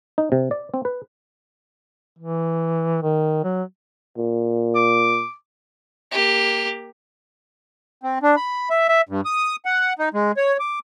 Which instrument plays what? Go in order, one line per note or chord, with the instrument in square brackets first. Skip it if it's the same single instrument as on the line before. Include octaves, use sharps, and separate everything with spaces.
[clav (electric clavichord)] D#4
C3
D5
C4
B4
[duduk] E3
D#3
F#3
[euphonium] A#2
[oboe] D6
[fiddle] A#3 G4
[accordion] C4
D4
B5
E5
E5
G2
D#6
F#5
D#4
G#3
C#5
D6